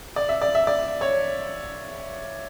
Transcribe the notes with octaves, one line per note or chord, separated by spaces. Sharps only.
D5
E5
D5
E5
D5
C#5